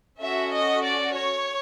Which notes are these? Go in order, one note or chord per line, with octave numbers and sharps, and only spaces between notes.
C#4 F#4 A4 E5
D#5
D5
C#5